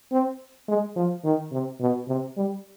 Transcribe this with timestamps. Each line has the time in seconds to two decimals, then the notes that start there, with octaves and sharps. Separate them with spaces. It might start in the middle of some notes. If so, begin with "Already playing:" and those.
0.12 C4
0.68 G#3
0.96 F3
1.24 D#3
1.52 C3
1.80 B2
2.08 C3
2.37 G3